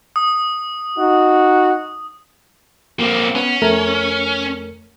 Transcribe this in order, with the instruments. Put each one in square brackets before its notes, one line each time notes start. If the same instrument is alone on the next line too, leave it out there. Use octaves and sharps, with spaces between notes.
[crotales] D#6
[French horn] D#4 [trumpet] F#4
[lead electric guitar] A#3 C4
[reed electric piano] B3 F#5 [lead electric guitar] C#4
[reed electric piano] F2 A3 A#4